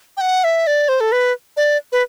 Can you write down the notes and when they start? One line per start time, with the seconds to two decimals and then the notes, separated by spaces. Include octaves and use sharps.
0.17 G5
0.21 F#5
0.44 E5
0.67 D5
0.89 C5
1.00 A4
1.12 B4
1.57 D5
1.92 B4